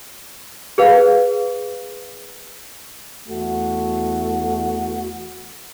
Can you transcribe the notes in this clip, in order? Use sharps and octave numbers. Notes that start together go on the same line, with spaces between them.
G#4 B4 F5
E2 A3 F#4